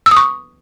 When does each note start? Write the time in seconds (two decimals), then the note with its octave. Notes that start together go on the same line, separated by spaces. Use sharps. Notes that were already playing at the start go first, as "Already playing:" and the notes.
0.06 E6
0.11 D#6
0.17 C#6